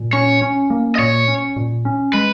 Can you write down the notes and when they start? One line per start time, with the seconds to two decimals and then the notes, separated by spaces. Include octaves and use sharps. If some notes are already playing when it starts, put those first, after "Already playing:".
Already playing: A#2
0.13 C#4 C#5
0.42 C#4
0.70 A#3
0.95 D#5
0.99 A#2 C#5
1.28 C#4
1.56 A#2
1.85 C#4
2.13 G#3 B4